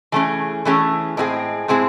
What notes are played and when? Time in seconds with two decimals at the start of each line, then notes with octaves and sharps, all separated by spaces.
0.12 E3 A3 C#4 G#4
0.65 E3 A3 C#4 G#4
1.17 A2 G#3 C4 E4 G#4
1.68 A2 G#3 C4 E4 G#4